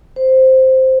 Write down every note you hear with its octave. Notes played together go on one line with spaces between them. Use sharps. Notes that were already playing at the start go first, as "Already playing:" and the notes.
C5